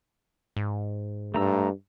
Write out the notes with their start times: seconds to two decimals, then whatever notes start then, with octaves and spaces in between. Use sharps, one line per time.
0.57 G#2
1.34 G2 A3 A#5 E6